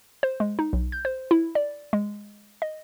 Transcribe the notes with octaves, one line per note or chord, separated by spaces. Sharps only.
C5
G#3
D#4
B1
G6
C5
E4
D5
G#3
D#5